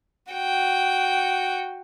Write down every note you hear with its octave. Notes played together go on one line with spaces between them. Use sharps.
F#4 G5